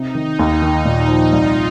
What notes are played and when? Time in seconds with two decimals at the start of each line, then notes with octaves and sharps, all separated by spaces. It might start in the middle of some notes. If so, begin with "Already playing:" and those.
Already playing: C3 D#4
0.15 D#3
0.39 D#2
0.62 D#3
0.85 A#2 D#4
1.08 F3
1.33 C2 F4